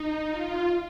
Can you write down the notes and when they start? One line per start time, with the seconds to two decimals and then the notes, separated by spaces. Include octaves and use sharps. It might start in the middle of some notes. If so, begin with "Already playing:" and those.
Already playing: D#4
0.30 F4